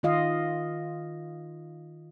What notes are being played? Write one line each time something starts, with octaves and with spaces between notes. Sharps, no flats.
D#3 F4 D#5 F5